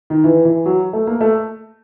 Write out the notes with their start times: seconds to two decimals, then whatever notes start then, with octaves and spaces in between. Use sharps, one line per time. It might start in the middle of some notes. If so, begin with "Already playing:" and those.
0.10 D#3
0.24 E3
0.45 E3
0.66 F#3
0.93 A3
1.07 A#3
1.21 A3